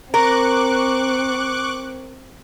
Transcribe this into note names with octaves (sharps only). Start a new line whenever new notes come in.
C4 A#4 C#6 D6 F#6